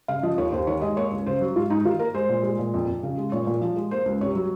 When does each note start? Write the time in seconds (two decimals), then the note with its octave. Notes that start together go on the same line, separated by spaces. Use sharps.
0.08 C#3 F5
0.23 F3 D#5
0.38 D#2 C#5
0.52 D#2 C5
0.67 D#3 C#5
0.81 G#3 D#5
0.96 A#3 C#5
1.11 C#2
1.26 C#3 C5
1.41 F#3
1.55 G#2 F4
1.70 G#2 D#4
1.85 D#3 F4
1.99 A#3 A#4
2.14 G#3 C5
2.29 A#2
2.43 G#3
2.59 A#2
2.74 F2
2.88 F2
3.03 C#3
3.18 G#3
3.32 A#2 C#5
3.47 A#2
3.61 F3
3.76 G#3
3.91 A#3 C5
4.06 C#2
4.21 C3 C#5
4.35 F#3